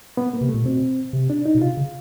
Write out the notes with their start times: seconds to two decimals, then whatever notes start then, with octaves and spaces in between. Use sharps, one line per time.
0.17 B3
0.33 A#3
0.41 C3
0.49 A3
0.54 A#2
0.65 B2 C4
1.13 C3
1.30 D4
1.46 D#4
1.55 B2
1.62 C3 F4
1.77 C#3